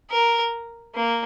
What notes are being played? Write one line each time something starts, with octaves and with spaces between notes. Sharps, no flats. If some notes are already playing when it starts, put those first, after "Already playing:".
A#4
A#3